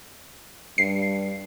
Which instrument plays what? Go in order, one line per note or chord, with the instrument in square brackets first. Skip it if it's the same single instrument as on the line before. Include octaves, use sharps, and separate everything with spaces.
[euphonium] G2 [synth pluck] C7